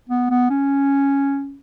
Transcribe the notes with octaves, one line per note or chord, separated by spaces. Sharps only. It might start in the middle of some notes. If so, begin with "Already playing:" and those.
B3
B3
C#4